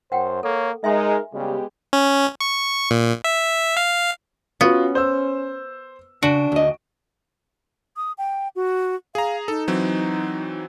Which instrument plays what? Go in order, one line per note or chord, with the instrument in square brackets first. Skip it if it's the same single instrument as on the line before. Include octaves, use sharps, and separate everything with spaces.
[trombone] F#2 [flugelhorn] C5 [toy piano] F#5 G5
[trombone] A#3 [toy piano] A4 [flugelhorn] C#5
[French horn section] G#3 [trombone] D#4 [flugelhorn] A#4 [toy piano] E5 G#5 C6
[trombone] C#3 [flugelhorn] G3 [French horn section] G#3 B3 G4
[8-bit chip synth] C#4
C#6
A#2
E5
F5
[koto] B3 [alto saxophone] C#4 [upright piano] F4 F#4
[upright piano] C5 E6
[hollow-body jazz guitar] C#3 [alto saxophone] D4 [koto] F#4 [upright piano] D7
[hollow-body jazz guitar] D2 D#5
[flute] D#6
G5
F#4
[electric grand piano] G#4 A#5 [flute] F5
[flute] D#4 [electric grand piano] A4
[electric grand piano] E3 F#3 C4